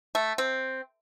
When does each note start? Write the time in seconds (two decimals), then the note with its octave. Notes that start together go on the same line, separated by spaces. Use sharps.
0.15 A3
0.38 C4